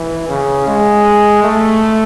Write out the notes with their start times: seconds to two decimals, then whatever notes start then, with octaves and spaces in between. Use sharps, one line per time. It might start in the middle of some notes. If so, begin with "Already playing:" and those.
Already playing: E3
0.29 C#3
0.67 G#3
1.44 A3